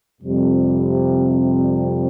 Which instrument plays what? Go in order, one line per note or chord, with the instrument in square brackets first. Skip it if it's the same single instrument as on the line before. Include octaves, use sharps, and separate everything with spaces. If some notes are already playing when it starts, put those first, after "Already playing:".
[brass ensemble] F2 C3 G3